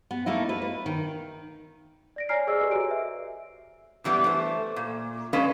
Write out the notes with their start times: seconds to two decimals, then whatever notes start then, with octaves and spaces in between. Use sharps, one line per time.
0.11 B3
0.26 A3 A#3 D#4 E4
0.49 B4
0.62 B4
0.86 D#3
2.16 D5 A#6 D7
2.29 C#5 D5 G#5 A#5 F6 C7
2.47 G#4 C5 D5 D#5 G#5 E6
2.60 G4 A4 B4 D5 D#5
2.71 F#4 C#5 D7
2.91 E5
4.04 G2 E3 G3 B3
4.24 A3 C5
4.76 A#2
5.33 G#3 C#4 D4 B4 D#5 F5